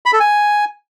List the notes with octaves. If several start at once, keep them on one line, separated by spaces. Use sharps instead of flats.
B5
A4
G#5